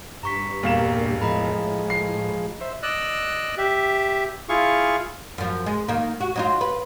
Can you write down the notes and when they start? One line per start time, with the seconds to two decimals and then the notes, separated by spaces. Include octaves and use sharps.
0.23 G2 A#5 C#6 B6
0.63 E1 A#2 G3 A#3 F5 E7
1.21 A2 F3 G#3 D#5 A#5 B5
1.90 C7
2.61 C5 E5
2.83 D5 D#5 E6 F#6
3.57 G4 E5
4.49 E4 F4 G#4 F5 C#6
5.38 F#2 F3
5.66 G#3
5.88 D#3 A#3
6.21 F#4
6.36 F#3 D#4 F4
6.61 B4